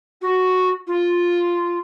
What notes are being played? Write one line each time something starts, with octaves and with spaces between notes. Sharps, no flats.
F#4
F4